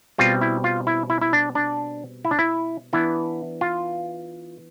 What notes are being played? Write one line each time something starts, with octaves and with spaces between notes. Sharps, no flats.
B2 G3 C4 F4
E4
F4
E4
E4
E4
D4
D4
E4
D4
E4
E3 B3 D4 E4
F4